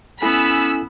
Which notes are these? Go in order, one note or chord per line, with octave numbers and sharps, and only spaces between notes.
B3 C#4 E4 A4 G#5 B5 E6